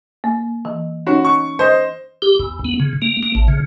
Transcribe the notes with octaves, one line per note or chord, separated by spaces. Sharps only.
A#3
E3
C#4 D#4 F#4 C#5
C#6
C5 D#5
G4
E2
B3
C#3
A#3
A#3
A1
C#3